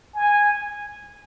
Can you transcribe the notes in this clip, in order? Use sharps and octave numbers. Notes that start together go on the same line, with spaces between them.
G#5